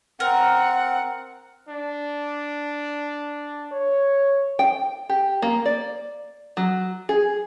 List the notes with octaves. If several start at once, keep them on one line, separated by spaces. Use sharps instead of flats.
C4 A#4 F#5
D4
C#5
G5
G4
A#3
D5
F#3
G#4